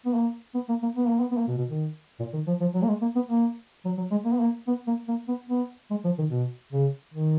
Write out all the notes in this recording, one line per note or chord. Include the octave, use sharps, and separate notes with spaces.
B3
A#3
B3
A#3
A#3
B3
A#3
B3
B3
A#3
B2
B2
D#3
A#2
D#3
F3
F3
F#3
A#3
G#3
A#3
B3
A#3
F#3
F#3
G#3
A#3
B3
A#3
B3
A#3
A#3
B3
B3
G#3
F3
D#3
B2
C#3
D#3